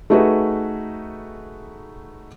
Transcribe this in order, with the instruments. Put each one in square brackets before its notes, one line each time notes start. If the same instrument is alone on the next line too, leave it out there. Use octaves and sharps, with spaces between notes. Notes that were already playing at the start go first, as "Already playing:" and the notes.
[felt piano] A3 D#4 F#4 G#4 B4